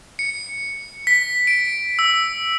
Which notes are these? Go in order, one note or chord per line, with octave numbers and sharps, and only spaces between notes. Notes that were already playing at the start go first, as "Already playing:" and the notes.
C#7
B6
D7
E6